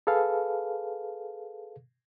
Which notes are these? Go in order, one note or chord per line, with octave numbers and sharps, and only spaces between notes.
G#4 A4 B4 F5